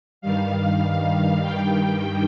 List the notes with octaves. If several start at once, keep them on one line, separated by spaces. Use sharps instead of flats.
G2 D#3 G3 F5
G5